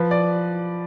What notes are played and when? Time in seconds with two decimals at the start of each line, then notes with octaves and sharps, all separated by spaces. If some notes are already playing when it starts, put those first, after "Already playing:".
Already playing: F3 B4
0.11 D5